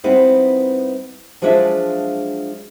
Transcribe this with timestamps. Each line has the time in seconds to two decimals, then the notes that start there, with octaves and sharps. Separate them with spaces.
0.04 G3 B3 C4 D#4 E4
1.42 F3 F#3 G#3 D4 F4 E5